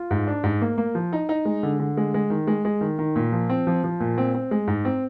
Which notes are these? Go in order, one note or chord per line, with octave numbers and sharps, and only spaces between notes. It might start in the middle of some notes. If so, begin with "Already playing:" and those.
Already playing: F4
G#2
D4
G#2
A#3
A#3
F3
D#4
D#4
G#3
D3
D3
G#3
G#3
D#3
G#3
G#3
D#3
D#3
A#2
F3
C4
F3
F3
A#2
C4
C4
G#3
G#2
C4